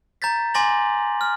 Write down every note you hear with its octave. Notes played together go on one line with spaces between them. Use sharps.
A#5 G6 A6 B6
G#5 C6 D6 A6 A#6 F#7
F6